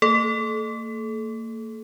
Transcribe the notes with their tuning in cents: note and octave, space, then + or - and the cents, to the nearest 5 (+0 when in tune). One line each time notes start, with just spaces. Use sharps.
A#3 -40 A4 -35